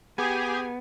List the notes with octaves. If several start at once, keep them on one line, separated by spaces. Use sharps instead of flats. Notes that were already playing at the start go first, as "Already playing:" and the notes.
B3 G4 G#4 G#5